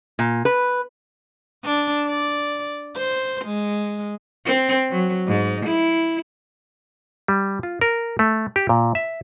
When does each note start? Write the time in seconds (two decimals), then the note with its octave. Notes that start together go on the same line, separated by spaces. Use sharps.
0.19 A#2
0.45 B4
1.64 D4
2.07 D5
2.96 C5
3.45 G#3
4.46 C4
4.90 F#3
5.28 G#2
5.66 E4
7.28 G3
7.63 F4
7.81 A#4
8.19 A3
8.56 G4
8.69 A#2
8.95 E5